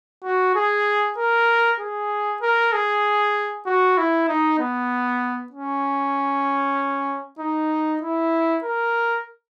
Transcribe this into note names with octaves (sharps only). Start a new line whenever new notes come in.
F#4
G#4
A#4
G#4
A#4
G#4
F#4
E4
D#4
B3
C#4
D#4
E4
A#4